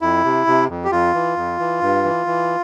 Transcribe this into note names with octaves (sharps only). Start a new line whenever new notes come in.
F2 E4
C3
C3
F2
G4
F2 F4
E3
F2
E3
G2
E3
E3